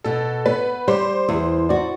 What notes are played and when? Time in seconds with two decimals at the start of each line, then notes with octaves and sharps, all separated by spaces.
0.04 B2 A4
0.46 B3 B4
0.88 G3 C5
1.28 E2
1.69 F#4 D5